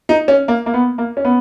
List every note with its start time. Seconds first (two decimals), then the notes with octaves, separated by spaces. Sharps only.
0.09 D#4
0.28 C#4
0.48 A#3
0.66 A#3
0.74 B3
0.98 A#3
1.17 C#4
1.25 B3